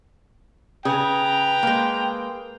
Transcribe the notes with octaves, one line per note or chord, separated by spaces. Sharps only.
C#3 G#4 B4 G5 A#5
G#3 A#3